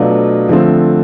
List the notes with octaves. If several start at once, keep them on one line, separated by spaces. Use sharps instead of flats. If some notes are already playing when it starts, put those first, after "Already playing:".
Already playing: B2 F#3 A3 D4 F4
D3 F3 A3 C4